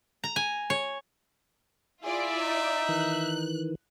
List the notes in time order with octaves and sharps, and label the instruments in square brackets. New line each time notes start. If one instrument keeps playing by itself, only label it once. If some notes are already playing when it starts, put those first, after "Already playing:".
[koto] A#5
G#5
C#5
[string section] E4 F4 D5 [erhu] G#4 [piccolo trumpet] E5
[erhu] D#4
[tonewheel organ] D#3 E3 [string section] F#6